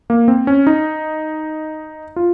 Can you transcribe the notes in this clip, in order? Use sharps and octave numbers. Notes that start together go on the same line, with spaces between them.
A#3
C4
C#4
D#4
F4